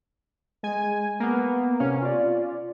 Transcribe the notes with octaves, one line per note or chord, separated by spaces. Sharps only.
G#3 G#5
A#3 B3
C3 C#4 F5
F4 D5